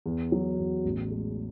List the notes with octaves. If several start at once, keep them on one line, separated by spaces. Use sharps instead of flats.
E2
F#3
E2
A1
G#3